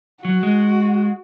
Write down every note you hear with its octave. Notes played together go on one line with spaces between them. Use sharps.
F#3 F#4
G#3